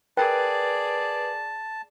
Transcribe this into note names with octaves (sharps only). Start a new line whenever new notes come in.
G#4 A#4 B4 D5 G5 A5